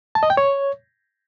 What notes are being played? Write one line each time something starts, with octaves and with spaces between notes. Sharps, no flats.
A5
D#5
G5
C#5